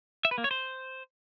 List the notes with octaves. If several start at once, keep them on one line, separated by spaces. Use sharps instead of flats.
E5
B4
A#3
C#5
C5